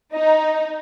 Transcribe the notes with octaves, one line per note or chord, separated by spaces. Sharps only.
D#4 D#5